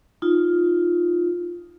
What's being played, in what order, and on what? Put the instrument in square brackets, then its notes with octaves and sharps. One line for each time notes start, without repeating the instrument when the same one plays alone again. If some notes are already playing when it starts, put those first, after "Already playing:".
[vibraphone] D#4 F4